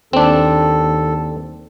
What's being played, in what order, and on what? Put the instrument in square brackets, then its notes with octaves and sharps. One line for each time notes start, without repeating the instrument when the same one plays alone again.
[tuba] D#2 [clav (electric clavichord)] C4 D4 [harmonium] A4